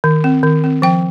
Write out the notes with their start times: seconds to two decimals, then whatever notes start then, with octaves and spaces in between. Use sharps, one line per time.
0.04 D#3
0.24 C4
0.43 D#3
0.64 C4
0.82 F3 G5